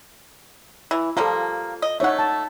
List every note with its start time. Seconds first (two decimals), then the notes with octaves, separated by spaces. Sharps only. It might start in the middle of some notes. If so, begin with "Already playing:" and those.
0.91 E3
1.17 F3 G3 A#3 F4 A4
1.82 D#5
2.00 A3 D#4 C#5 E5 F#5
2.19 A5